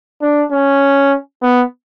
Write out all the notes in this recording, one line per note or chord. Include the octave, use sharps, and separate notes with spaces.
D4
C#4
B3